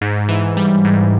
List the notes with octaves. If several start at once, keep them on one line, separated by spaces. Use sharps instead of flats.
G#2
E3
G3
G#2